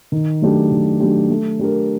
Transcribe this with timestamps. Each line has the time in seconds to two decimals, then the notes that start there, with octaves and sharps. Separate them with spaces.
0.12 D#3
0.42 F#3 A3 D4 G4
0.71 D#3
1.00 F#3 A3 D4 G4
1.30 A3
1.59 D4 G4 A#4